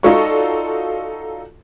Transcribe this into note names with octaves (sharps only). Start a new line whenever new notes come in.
D#4 F4 F#4 A4 D5 C#6